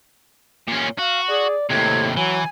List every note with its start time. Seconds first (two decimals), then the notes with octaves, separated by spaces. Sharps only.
0.68 A#2 C#4
0.98 F#4 F5
1.29 G#4 D5
1.70 D#2 A2 C3 G#6
2.17 E3 F#3 G#5